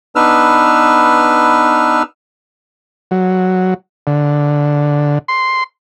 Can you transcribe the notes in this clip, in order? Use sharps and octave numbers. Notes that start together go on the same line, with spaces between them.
B3 D4 D#4 B4 E6 F6
F#3
D3
C6